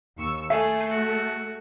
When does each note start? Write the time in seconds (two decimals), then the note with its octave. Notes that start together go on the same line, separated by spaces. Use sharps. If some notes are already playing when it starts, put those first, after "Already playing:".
0.17 D#2 C#6 E6
0.50 A3 G#4 A4 E5
0.90 F#4